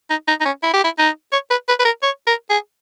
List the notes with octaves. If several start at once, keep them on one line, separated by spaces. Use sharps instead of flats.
D#4
D#4
D#4
C#4
E4
G4
E4
D#4
C#5
B4
B4
B4
A#4
C#5
A#4
G#4